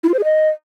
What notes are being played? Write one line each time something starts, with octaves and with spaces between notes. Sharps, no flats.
E4
F4
C5
G#4
D#5